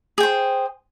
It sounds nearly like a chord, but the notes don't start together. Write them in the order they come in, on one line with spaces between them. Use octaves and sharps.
G#4 G5 C5